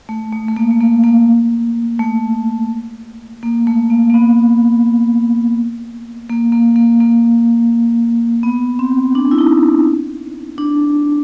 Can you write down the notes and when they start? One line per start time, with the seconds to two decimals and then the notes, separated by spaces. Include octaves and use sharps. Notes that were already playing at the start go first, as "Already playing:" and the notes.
0.09 A3
0.32 A3
0.48 A3
0.56 A#3
0.71 A3
0.81 A#3
1.04 A#3
1.99 A3
3.43 A#3
3.67 A3
3.90 A#3
4.10 A#3
4.14 B3
6.29 A#3
6.52 A#3
6.76 A#3
7.01 A#3
8.43 B3
8.79 C4
9.15 D4
9.31 E4
9.38 D#4
10.58 D4